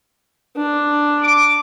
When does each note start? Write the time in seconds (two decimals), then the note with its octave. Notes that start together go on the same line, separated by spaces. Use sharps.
0.56 D4
1.23 D6